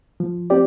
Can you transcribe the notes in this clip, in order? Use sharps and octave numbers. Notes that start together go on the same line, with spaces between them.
F3
C4 G4 D5